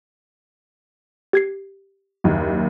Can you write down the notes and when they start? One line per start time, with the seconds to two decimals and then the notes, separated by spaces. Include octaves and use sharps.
1.33 G4 G#6 C7
2.24 F#1 D#2 D#4